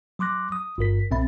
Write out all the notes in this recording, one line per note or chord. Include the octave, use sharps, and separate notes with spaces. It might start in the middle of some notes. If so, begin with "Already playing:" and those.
F#3 C6 D6 F#6 A#6
D#6
G1 G2 A#4 B6
B1 A#2 C4 E5 B5 A6